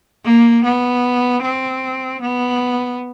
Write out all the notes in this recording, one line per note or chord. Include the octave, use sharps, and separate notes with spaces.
A#3
B3
C4
B3